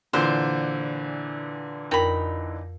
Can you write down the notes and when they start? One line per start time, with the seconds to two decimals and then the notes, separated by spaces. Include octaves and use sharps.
0.13 A#2 D3 E3 C5
1.91 F2 D#4 A#4 G5 B5